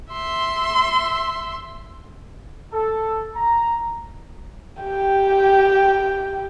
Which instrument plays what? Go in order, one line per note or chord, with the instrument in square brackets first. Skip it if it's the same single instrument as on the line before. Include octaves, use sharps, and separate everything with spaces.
[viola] E5 C6
[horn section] A4
A#5
[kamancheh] G4 G5